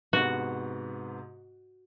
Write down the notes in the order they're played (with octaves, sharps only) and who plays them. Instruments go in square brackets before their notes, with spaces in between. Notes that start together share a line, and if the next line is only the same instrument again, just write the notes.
[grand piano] G#2 C3 B3 [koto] F#4